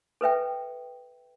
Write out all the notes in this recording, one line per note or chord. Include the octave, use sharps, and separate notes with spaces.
A4 B4 E5 G5